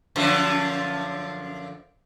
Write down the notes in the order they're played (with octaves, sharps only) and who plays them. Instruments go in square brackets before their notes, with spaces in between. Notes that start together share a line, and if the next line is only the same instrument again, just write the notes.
[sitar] F#2 D3 F3